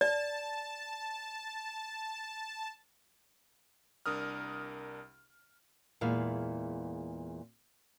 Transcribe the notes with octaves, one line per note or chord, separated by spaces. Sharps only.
D5 A5
C2 D4 A#4 D#6 F6
E2 A#2 G#3 E4 F5